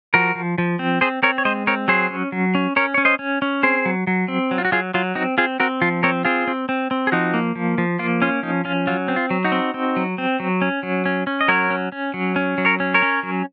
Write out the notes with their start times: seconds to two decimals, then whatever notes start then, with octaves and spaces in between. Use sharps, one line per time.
0.14 F3 F#4 A#4
0.35 F3
0.58 F3
0.79 C4
1.01 C4 G#4 C5
1.23 C4 A#4 C#5
1.38 C#5
1.45 G#3 C5 D#5
1.67 C4 A#4 C#5
1.88 F#3 G#4 C5
2.10 C#4
2.32 F#3
2.55 C#4
2.76 C#4 A#4 C#5
2.94 C#4 C#5
3.05 C5 D#5
3.19 C#4
3.42 C#4
3.63 C4 G#4 C5
3.85 F#3
4.07 F#3
4.28 C4
4.51 F#3
4.58 F4
4.65 F#4
4.72 F#3 F4 G#4
4.94 F#3 F4
5.15 C4 D#4 F#4
5.38 C4 F4 G#4
5.60 C4 F#4 A#4
5.82 F3 F4
6.03 C4 A#4 C#5
6.25 C4 F4 G#4
6.47 C4
6.69 C4
6.91 C4
7.07 G#4
7.12 F3 D#4 F#4
7.34 A#3
7.55 F3
7.78 F3
7.99 A#3 F4
8.22 C#4 F4
8.43 F3 D#4
8.65 C#4 F4
8.87 F#3 F4
9.08 C4
9.16 F4
9.30 F#3
9.44 D#4 F#4
9.52 C4
9.74 C4
9.96 F#3
10.18 C4
10.40 F#3
10.62 C#4
10.83 F#3
11.06 C#4
11.27 C#4
11.41 D#5
11.48 F#3 A#4 C#5
11.70 C#4
11.92 C#4
12.14 F#3
12.36 C#4
12.58 F#3
12.65 A#4 C#5
12.80 C#4
12.94 A#4 C#5
13.02 C#4
13.23 F#3